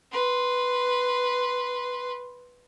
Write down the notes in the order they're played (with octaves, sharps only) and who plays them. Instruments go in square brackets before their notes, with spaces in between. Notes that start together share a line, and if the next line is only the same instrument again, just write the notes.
[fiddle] B4 C6